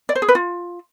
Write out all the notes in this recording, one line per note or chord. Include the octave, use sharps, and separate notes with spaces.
D5
C5
G#4
B4
F4